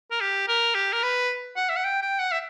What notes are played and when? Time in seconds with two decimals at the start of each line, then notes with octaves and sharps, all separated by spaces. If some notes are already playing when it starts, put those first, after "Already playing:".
0.11 A#4
0.21 G4
0.48 A#4
0.75 G4
0.93 A#4
1.03 B4
1.56 F#5
1.70 E5
1.77 F#5
1.85 G5
2.02 G5
2.20 F#5
2.32 E5